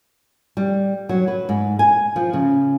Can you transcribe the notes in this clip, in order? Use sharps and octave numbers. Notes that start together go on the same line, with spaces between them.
G3
F#3
B4
G#2
G#5
F3
C#3